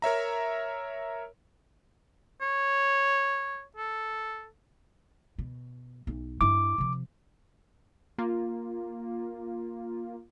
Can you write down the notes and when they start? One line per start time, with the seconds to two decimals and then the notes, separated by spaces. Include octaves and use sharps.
0.02 A#4 C#5 E5 A#5
2.42 C#5
3.77 A4
5.38 B2
6.07 B1
6.41 G2 E4 D6
6.78 C3 F3
8.18 A#3 F4